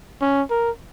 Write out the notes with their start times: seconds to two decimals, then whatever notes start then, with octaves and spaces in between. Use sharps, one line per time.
0.22 C#4
0.51 A#4